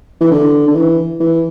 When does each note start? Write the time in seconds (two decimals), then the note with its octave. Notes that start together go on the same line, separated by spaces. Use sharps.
0.21 E3
0.32 D3
0.68 D3
0.76 E3
1.20 E3